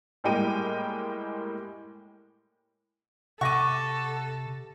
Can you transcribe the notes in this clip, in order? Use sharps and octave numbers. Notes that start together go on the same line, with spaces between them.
A2 G3 G#3 A#3 G5 D#7
C3 A4 F#5 C#6 D6 A#6 D#7